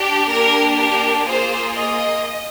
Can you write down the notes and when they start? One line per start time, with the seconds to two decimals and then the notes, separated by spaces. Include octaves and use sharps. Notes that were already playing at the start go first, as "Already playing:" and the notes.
Already playing: D4 G4
0.28 A#3 D4 G4 A#4
0.76 A#4
1.26 A#3 F4 G#4 C5
1.74 D#5